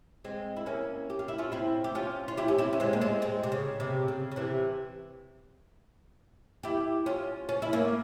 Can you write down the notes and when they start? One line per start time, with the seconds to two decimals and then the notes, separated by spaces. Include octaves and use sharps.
0.24 G#3 C4
0.56 E4
0.66 A#3 C#4
1.10 G4
1.19 F4
1.28 E4
1.38 C#4 F4
1.52 C4 E4
1.84 G4
1.95 C#4 F4
2.28 F4
2.37 E4 G4
2.48 C#4
2.58 C4 E4
2.73 C#4
2.80 G#3 C4
2.93 A#3
3.01 G#3 C4
3.22 G#3 C4
3.43 C3
3.52 C#3
3.80 C3
4.08 C#3
4.31 C#3
4.36 C3 E3
6.63 E4 G4
7.06 C#4 F4
7.49 C#4
7.62 E4
7.73 A#3 C#4